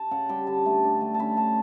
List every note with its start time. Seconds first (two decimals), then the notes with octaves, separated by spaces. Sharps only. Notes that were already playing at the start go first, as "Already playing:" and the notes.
Already playing: A5
0.11 C#3 F#5
0.29 G3 G5
0.47 D3 A5
0.66 A3
0.84 D4
1.01 A3
1.14 A5
1.20 C#4 B5
1.37 A5